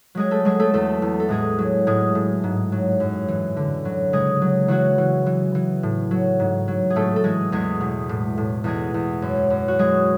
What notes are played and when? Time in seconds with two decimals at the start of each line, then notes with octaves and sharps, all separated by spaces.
0.15 F#3 G#3 G#4
0.31 A3 A4
0.45 F#3 G#3 G#4
0.60 A3 A4
0.74 E2 A3 A4
1.02 E2
1.20 A4
1.29 A2 G#3 G#4
1.58 F#3
1.87 A2 G#3 G#4
2.15 A2
2.44 G#2
2.72 F#3
3.00 F#2
3.28 E3
3.56 D3
3.85 F#3
4.13 C#3 G#3 G#4
4.42 F#3
4.68 E3 F#3 F#4
4.98 E3
5.26 E3
5.55 E3
5.83 A2
6.11 F#3
6.40 G#2
6.68 F#3
6.90 G#4
6.96 A2 A3 A4
7.16 A4
7.24 E3 G#3 G#4
7.52 E2 G#3 G#4
7.81 B2
8.09 A2
8.38 A2
8.64 E2 G#3 G#4
8.94 E2
9.22 F#2
9.50 F#2
9.68 F#4
9.79 F#3 G#3 G#4